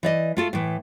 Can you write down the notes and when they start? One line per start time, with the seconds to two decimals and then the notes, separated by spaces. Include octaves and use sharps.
0.03 E3 D5 D#5
0.37 A3 F4 A4
0.53 A2 E3